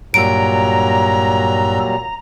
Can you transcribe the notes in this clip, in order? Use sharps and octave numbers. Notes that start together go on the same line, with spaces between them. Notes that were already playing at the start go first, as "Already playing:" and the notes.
G2 A#2 F#3 G3 A#5 E6 D7